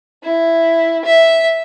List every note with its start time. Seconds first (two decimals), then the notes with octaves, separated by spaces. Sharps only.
0.24 E4
1.05 E5